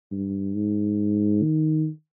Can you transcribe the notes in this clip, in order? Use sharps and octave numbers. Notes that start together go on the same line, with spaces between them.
G2
G#2
D#3